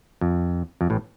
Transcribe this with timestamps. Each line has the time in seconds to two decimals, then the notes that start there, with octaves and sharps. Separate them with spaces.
0.21 F2
0.81 F2
0.90 A1 A2